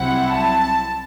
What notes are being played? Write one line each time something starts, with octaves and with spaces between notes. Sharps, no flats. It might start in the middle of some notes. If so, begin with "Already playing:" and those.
Already playing: C2 C3 F#3 C4 E4 F#5
A5